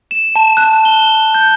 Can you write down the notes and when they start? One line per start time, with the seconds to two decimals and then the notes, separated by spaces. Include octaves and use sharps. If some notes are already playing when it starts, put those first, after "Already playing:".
0.11 E7
0.36 A5
0.57 F#6
0.85 G7
1.34 G6